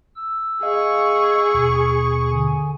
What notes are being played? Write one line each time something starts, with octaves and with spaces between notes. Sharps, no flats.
E6
G#4 D#5 F5 C#6
D#2 B2 D#6
D3 G#5